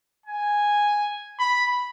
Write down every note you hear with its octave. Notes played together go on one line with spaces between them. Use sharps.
G#5
B5